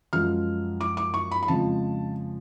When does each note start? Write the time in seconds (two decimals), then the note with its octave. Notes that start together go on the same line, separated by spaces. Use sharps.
0.13 F#2 F3 G#3 F6
0.81 D6
0.97 D6
1.14 C#6
1.31 B5
1.43 B5
1.47 F2 C#3 F3 G#3 A5